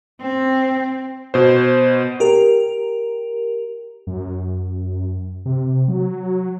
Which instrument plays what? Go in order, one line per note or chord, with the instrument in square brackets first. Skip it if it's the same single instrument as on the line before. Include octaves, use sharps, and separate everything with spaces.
[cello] C4
[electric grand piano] B2 C5
[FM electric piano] G4 A#4
[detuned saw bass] F#2
C3
F#3